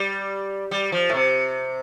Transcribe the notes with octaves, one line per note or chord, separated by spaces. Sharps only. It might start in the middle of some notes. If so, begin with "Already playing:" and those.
Already playing: G3
G3
F3
A2
C3